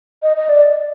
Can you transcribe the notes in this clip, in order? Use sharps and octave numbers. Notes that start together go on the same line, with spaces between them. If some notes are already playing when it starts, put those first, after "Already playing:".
D#5
D#5
D5